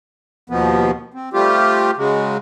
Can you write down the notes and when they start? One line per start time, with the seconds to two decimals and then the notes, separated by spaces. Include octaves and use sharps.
0.50 D#2 B2 F3 B3
1.14 C4
1.33 G3 A3 C4 F4 G4
1.97 C#3 F#3 G#3